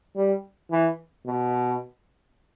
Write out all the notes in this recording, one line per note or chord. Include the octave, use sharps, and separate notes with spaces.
G3
E3
B2